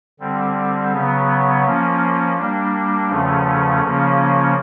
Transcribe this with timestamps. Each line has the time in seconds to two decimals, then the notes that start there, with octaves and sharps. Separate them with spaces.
0.20 D3 G3 C4
0.92 C#3 F#3 B3
1.64 F3 A#3 C#4
2.37 G3 A#3 D4
3.09 E2 C#3 F3 A3 C#4
3.81 C#3 F3 A#3 C#4